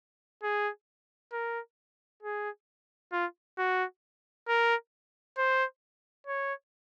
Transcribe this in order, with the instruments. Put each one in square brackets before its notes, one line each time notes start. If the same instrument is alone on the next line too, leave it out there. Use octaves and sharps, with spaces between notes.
[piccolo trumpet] G#4
A#4
G#4
F4
F#4
A#4
C5
C#5